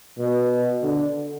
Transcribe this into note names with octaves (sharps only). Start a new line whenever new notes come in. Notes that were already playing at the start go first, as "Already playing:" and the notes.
B2
D3